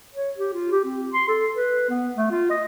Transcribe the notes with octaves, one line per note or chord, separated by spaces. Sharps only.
C#5
G4
F4
G4
C4
C6
A4
B4
B3
A3
F4
D#5